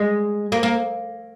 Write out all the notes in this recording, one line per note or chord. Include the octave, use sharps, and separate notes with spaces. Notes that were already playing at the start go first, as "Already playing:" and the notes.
Already playing: G#3
A#3
A#3